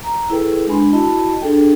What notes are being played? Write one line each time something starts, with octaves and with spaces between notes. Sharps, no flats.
A#5
E4 G#4 A4 B4 G5
G#3 D4 G#5 B5 C6
E4 F#4 D#5 A5 B5
D4 G#4 A4 G5